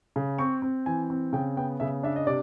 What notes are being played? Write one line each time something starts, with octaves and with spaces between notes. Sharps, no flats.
C#3
C4 C#6
C4
E3 G#5
C4
C#3 G5
B3 G5
C#3 E5
D4 E5
D#5
C3 D5